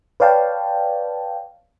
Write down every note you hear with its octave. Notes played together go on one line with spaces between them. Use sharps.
B4 C#5 D5 F5 G5 A5